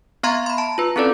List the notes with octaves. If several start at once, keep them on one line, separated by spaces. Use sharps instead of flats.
B3 E5 F5 A#5 C6 G#6
B5 C6
A5
F4 B4
C4 C#4 E4 A4 B4 D5